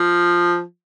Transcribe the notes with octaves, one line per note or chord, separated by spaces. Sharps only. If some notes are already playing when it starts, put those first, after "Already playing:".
Already playing: F3